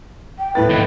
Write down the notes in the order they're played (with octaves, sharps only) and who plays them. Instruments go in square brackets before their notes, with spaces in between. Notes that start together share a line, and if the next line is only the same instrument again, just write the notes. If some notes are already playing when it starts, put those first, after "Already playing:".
[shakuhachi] G5
[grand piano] G1 A2 A6 [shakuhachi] B4
[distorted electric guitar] D#2 G#2